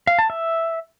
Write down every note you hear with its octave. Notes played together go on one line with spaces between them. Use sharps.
F5
A5
E5